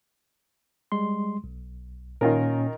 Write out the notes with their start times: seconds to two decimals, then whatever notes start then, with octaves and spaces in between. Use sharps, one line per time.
0.92 G3 G#3 C6
1.44 B1
2.21 A#2 D#3 C#4 F4 A#4